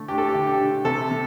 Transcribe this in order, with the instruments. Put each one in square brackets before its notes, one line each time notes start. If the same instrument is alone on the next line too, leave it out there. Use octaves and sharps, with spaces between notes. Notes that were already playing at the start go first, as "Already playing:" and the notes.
Already playing: [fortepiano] D3 A3
D4 G4
A4
G4
D3
G4
D3
C3 A4
C3